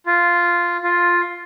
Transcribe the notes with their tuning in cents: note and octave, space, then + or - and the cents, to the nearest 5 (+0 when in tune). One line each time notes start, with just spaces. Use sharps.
F4 -5
F4 +5